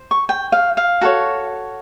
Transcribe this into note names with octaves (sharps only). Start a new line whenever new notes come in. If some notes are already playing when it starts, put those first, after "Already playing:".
Already playing: C5
C#6
G5
F5
F5
F#4 A4 C#5